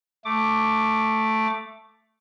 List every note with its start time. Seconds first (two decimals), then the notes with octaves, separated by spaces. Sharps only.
0.25 A3 D6